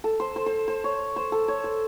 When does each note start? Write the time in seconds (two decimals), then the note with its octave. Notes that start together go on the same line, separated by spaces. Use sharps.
0.04 A4
0.20 C5
0.36 C5
0.46 C5
0.68 C5
0.84 C#5
1.16 C5
1.32 A4
1.48 C#5
1.64 C5